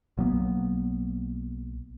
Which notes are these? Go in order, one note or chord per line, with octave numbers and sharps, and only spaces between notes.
B1 F#3 A#3 B3